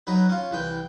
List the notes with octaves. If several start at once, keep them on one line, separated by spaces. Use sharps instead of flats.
F#3 D#4 B4
C#4 F4
C2 E3 G5